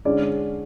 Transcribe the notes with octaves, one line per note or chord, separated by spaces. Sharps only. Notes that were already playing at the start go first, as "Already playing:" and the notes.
D3 G#3 C#4 D5